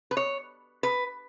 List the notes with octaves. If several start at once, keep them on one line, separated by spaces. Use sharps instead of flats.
B4
C#5
B4